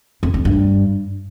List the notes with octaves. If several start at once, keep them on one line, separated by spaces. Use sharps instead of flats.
F2
F2
G2